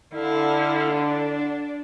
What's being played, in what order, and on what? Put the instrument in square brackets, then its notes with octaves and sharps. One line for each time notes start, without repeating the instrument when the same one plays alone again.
[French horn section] D3 [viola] E4 F5
[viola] D4